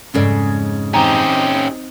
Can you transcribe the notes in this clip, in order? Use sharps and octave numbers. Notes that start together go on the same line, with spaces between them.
F2 G#2 C#3 C#4 A4 D5
C4 C#4 D#4 G4 A#5